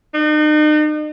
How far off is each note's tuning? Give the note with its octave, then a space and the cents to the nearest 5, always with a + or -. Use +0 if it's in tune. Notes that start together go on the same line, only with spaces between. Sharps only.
D#4 -40